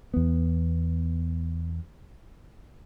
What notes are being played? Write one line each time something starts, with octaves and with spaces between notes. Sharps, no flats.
E2 B3